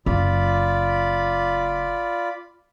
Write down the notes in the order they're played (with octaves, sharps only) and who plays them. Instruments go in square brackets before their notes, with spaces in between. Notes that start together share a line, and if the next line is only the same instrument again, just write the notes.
[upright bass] F#1 [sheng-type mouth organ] F4 D5 B5